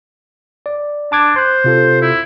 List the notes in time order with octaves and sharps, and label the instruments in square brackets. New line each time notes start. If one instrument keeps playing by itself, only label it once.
[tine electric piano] D5
[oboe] D4 [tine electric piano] A5 D6 G#6
[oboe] C5 [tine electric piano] C6 F#6
[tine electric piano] C3 F4 A4
[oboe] E4